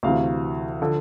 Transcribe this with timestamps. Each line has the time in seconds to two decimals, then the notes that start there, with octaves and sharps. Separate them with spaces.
0.03 D2 C3 E3 F5
0.80 D3 F3